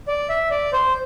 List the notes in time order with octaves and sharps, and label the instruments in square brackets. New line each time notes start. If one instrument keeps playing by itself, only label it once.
[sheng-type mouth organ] D5
E5
D5
C5